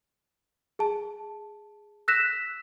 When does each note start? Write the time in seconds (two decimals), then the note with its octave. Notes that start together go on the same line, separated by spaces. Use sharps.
0.79 G#4 A5
2.08 E6 F#6 A#6 B6 E7